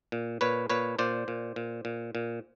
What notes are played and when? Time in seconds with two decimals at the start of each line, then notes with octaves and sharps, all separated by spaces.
0.12 A#2
0.41 A#2 B4 C#5
0.70 A#2 B4 C#5
0.99 A#2 C5 D5
1.28 A#2
1.56 A#2
1.85 A#2
2.15 A#2